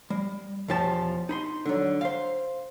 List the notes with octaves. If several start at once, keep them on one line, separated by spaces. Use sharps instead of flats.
G3
B1 E2 F3 G4 A5
D#4 B5 C6
D3 F#3
C5 F5